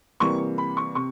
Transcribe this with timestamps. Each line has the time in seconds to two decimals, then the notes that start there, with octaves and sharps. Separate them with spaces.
0.20 C3 E3 G3 A#3 C#6
0.58 B5
0.77 C#6
0.95 C3 C#6